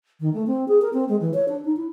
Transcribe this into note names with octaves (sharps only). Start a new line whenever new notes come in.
D#3
A3
C4
G#4
A#4
C4
G#3
E3
C#5
D4
D#4
E4